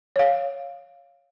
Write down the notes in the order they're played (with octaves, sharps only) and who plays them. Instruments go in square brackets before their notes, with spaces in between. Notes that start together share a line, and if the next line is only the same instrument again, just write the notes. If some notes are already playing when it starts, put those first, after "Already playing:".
[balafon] C#5 F5